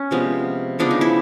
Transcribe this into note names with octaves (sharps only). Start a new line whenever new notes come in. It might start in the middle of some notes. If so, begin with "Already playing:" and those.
Already playing: C#4
C3 F3 G#3 B3
C#3 F3 G#3 B3 D4
D#4
E4